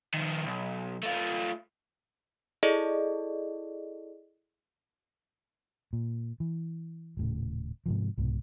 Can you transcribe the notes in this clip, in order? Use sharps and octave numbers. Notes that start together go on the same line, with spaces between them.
D#3 F3
B1
A3 F4
E4 G#4 A4 D5 D#5
A#2
E3
D#1 A2 C#3
G#2 C3 F3
C2 G#2 B2